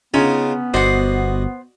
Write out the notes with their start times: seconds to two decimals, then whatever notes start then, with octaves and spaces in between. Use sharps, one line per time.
0.14 C#3 B3 C#4 D#4 F4
0.74 G1 F#4 C5 D5 D#5 F#5